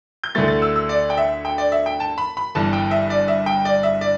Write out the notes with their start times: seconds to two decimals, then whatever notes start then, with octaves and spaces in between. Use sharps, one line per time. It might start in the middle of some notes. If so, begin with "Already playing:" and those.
0.24 G6
0.35 D2 D3 A3 E4 A6
0.48 A6
0.62 E6
0.76 E6
0.89 D5
1.10 G5
1.17 E5
1.45 G5
1.58 D5
1.72 E5
1.86 G5
2.00 A5
2.18 B5
2.37 B5
2.55 G1 G2 E3 A5
2.73 G5
2.91 E5
3.10 D5
3.28 E5
3.46 G5
3.65 D5
3.83 E5
4.01 D5